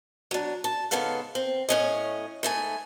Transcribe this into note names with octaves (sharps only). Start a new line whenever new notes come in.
F#3 D4
A5
G#2 C#3 B3 A4 F5
C4
A2 C#4 D#5
G#2 A3 G#5